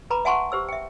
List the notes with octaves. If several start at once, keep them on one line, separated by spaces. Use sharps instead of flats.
B4 A#5 B5 D6
E5 F#5 G#5 A5 C6 C#6
G4 C5 E6
E5 G5